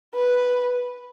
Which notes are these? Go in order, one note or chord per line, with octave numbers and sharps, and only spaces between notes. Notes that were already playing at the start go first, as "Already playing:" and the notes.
B4